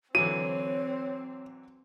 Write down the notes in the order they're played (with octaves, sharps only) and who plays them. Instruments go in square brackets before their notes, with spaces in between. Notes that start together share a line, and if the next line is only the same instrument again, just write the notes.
[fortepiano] D3 E3 F#3 [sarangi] C4 [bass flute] C#5 [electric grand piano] D#7